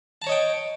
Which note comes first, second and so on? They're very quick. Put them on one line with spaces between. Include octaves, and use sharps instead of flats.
A5 A#5 C#5 D#5 G5